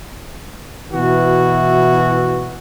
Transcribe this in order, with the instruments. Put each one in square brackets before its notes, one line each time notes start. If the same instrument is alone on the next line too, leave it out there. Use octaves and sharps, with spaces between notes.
[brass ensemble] B2 E3 E4 F#4